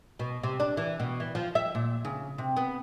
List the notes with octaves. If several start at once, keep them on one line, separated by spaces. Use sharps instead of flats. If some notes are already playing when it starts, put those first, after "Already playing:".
B2
C3
D4
E3
B2
E3
F3
E5
A#2
C#3
C3
B3